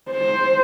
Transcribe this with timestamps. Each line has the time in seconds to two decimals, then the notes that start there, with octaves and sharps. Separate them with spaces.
0.10 C5